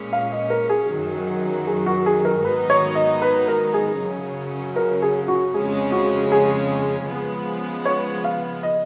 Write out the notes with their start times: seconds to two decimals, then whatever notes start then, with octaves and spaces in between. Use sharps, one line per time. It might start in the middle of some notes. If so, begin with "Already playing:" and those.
Already playing: A#2 G#3 C#4
0.13 F5
0.32 D#5
0.50 A#4
0.70 G#4
0.89 F#2 D#3 F#3
1.67 G#4
1.86 F#4
2.06 G#4
2.25 A#4
2.44 G#2 D#3 F#3 B3 D#4 B4
2.70 C#5
2.95 D#5
3.22 B4
3.48 A#4
3.74 G#4
3.99 F#2 C#3 F#3 C#4
4.76 A#4
5.02 G#4
5.28 F#4
5.54 F2 C#3 G#3 C#4 G#4
5.92 F#4
6.32 G#4
7.09 C#3 F3 G#3 B3
7.85 C#5
8.24 F5
8.63 D#5